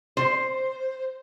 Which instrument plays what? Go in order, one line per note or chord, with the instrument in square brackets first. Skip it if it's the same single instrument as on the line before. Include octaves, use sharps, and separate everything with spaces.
[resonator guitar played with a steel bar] C5